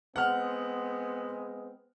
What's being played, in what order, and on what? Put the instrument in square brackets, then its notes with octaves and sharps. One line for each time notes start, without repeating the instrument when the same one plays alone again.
[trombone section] G#3 B3 C4 [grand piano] F#5 F6